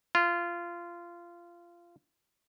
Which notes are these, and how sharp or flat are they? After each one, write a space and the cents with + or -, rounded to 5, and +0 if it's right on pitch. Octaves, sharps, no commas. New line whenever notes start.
F4 -20